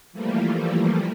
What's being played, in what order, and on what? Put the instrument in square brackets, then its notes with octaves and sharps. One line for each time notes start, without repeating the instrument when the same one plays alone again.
[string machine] E3 F3 G3 A3 A#3